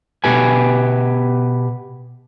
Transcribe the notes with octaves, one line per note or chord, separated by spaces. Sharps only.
B2 B3 G4 B4 G#5